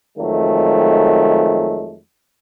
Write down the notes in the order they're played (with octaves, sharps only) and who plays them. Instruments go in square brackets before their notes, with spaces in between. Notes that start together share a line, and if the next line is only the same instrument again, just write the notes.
[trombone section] F2 D#3 F#3 G#3 A3